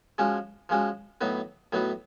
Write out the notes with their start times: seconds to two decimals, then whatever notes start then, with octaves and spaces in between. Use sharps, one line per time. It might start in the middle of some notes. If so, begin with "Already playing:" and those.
0.18 F3 G#3 C#4 F#4
0.69 F3 G#3 C#4 F#4
1.21 A2 F#3 B3 D#4 F#4
1.72 A2 F#3 B3 D#4 F#4